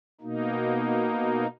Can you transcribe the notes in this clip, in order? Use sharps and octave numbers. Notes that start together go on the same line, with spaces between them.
B2 A#3 D#4